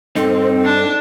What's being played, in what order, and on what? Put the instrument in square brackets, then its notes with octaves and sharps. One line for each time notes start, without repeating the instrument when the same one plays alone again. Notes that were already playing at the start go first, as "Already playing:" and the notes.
[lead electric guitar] G2 D#4 [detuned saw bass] C4 [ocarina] A4
[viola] D4